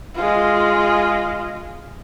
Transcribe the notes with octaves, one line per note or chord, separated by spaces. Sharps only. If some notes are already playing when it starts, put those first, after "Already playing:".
G#3 F4